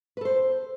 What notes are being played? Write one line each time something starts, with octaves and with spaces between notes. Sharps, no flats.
A4 B4 C5